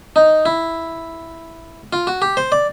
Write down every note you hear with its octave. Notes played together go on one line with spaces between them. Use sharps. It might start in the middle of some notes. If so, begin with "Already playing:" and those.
D#4
E4
F4
F#4
G4
C5
D5